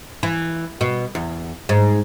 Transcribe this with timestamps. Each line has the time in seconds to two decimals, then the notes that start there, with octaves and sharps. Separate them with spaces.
0.23 E3
0.81 B2
1.15 E2
1.69 G#2